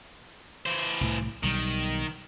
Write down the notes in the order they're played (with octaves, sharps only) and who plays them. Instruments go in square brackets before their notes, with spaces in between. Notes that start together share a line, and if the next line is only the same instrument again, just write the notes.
[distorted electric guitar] E3 C5
[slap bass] C2 A2
[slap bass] B1 G3 [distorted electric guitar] D#3